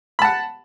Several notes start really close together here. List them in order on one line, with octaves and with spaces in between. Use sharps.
B5 A5 F#5